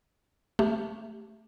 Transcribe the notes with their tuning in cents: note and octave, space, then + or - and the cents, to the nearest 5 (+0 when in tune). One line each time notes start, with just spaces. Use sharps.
A3 +0 G4 +0